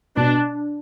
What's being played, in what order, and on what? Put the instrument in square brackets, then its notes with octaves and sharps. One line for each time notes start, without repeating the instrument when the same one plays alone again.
[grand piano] B2 [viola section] D4